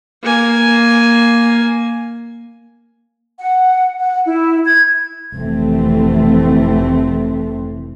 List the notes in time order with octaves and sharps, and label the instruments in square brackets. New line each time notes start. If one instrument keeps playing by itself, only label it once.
[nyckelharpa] A#3 G#5
[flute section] F#5
F#5
E4
G#6
[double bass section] F1 E3 A3 C4